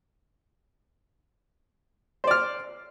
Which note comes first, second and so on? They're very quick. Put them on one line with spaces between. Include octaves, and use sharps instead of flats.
C5 D5 F6